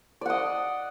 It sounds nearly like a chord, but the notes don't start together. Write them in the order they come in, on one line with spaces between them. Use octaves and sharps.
D5 F#5 D#5